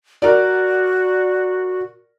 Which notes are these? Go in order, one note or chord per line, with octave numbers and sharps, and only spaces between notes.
F#4 A#4 D5